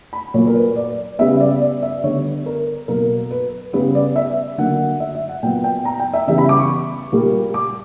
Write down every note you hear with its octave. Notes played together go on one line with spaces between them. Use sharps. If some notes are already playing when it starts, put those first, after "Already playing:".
B5
A#2 F#3 A#3 C#5
A#4
B4
D5
C#3 G3 B3 E5
D5
D5
E5
D3 G3 B3 C#5
A#4
B2 F#3 A#3 A#4
B4
C#3 G3 B3 B4
D5
E5
D3 F#3 A#3 F#5
E5
E5
F#5
A#2 F#3 B3 G5
G5
A#5
G5
E5
C#3 E3 G3 B3 E5
B5
D6
C#6
A#2 G3 A#3
D6